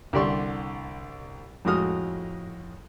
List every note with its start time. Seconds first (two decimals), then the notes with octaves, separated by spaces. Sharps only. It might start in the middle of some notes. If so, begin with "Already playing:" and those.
0.13 C2 D3 G4 D5 C6 C#6
1.65 F2 A2 G#3 F#4 D#6 F6